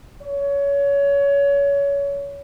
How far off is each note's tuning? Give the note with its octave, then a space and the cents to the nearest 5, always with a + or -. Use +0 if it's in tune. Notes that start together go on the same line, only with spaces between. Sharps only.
C#5 +25